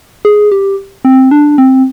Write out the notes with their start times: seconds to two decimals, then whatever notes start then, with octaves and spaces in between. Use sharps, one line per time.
0.25 G#4
0.52 G4
1.05 C4
1.31 D4
1.58 C4